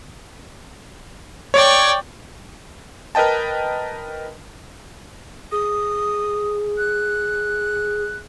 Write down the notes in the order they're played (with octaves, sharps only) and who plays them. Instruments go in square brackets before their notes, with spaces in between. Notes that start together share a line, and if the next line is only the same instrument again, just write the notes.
[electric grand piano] C#5 [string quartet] D5 G5 C#6
[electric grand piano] A#4 B4 D#5 G5 A5
[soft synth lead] G#4 [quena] D#6
[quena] F#6